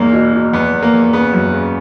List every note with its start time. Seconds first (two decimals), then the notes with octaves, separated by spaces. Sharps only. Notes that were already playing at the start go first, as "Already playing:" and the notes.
Already playing: E2 G#2 A#3
0.13 B2
0.33 B2
0.53 E2 B3
0.73 E2
0.82 A#3
0.93 E2
1.13 C#3 B3
1.33 F#2
1.53 C#3